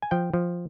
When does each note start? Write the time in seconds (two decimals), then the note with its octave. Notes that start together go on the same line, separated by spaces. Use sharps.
0.02 G#5
0.11 F3 G5
0.34 F3